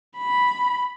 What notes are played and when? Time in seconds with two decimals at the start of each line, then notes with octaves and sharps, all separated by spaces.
0.18 B5